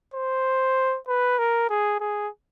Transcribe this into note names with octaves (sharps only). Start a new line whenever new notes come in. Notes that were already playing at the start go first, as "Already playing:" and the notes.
C5
B4
A#4
G#4
G#4